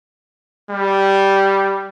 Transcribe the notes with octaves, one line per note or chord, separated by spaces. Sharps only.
G3